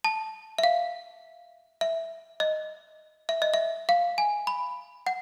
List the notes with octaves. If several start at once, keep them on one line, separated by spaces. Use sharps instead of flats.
A5
E5
F5
E5
D#5
E5
D#5
E5
F5
G#5
B5
F#5